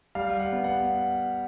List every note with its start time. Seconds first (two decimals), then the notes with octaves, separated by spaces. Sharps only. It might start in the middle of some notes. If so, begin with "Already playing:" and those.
0.15 G3 F5
0.40 F#5
0.52 B3
0.64 F#5